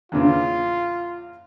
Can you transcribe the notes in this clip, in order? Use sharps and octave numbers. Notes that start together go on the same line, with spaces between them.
E2 A#2 C#3 F4